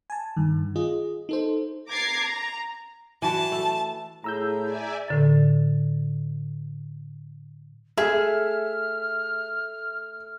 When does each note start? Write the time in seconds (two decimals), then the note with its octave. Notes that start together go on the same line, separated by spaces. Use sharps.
0.10 G#5 A5
0.37 G2 D#3
0.76 F4 G#4 D#5
1.29 D#4 A4 C5
1.88 A#5 D6 G#6 A6 C7
2.21 A#5
3.22 E3 F#4 A5
3.52 A3
4.24 A2 E4 G#4 A#5 E6 G6
4.62 D5 E5 G#5
5.08 A2 D3 A6
7.98 A3 G#4 E5 F6